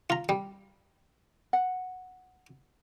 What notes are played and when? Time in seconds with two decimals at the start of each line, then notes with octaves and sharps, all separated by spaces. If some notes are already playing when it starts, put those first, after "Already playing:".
0.10 F4 A#5
0.29 G3
1.53 F#5